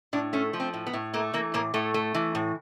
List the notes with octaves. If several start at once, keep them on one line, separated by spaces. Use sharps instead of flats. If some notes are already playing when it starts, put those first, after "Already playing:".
A2 D4
A3 C#4
F3
C4
A2
B3
A2
A3 A#3
E3 A#3
A2 A#3
A2 A3
A3
E3
A2